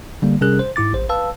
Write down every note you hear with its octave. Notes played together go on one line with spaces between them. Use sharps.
D3 G3 A#3
C3 G3 C#4 G#4 A#4 F#6
C5
G#2 E4 D6 A6
A1 C5
B4 F5 A5 E6